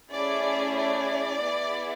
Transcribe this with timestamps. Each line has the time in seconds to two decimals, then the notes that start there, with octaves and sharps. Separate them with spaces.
0.11 A3 C#4 E4 G#4 D5
0.78 D5
1.44 B3 E4 G#4